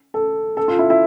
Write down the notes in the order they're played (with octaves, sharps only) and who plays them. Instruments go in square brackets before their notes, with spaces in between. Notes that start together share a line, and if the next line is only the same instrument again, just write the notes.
[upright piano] A4
A4
F4
E4
E4